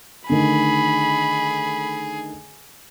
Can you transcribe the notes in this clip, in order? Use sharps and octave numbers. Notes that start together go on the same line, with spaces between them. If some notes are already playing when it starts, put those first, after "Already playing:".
D3 D#3 A3 G#4 B5